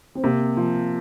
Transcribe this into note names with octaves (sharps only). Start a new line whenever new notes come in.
C4
C3 A#3
F3